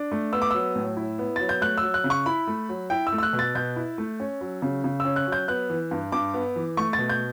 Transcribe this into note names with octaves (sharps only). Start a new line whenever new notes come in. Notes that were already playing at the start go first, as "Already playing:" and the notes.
Already playing: D4
A3
B3 E6
D6
F#3 E6
A2
E4
B3
F#3 A6
G6
A3 F#6
E6
F#3
F#6
C#3
C#6
E4 B5
A3
F#3
E4 G5
E6
A3
E6
F#6
B2
A6
B2 G6
E4
A3
C#4
F#3
C#3
C#3
C#4 E6
F#6
F#3
G6
B3 F#6
E3
G2
G2 D6
B3
E3
A3 C#6
A6
B2
G6